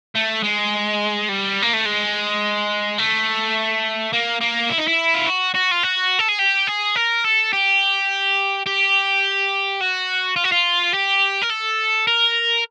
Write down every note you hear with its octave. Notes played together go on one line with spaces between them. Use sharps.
A3
G#3
G3
A#3
A3
G#3
A3
A#3
A#3
E4
D#4
E4
F4
F#4
F#4
F4
F#4
A4
G#4
G4
G#4
A#4
A4
G4
G4
F#4
F4
F#4
F4
G4
A#4
A4
A#4